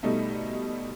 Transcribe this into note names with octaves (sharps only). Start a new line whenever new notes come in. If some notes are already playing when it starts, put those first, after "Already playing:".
B2 G3 A3 D#4